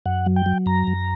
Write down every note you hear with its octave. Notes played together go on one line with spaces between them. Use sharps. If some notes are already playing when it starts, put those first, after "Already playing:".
F#2 F#5
F#3
G5
F#3
F#2 A#5
F#2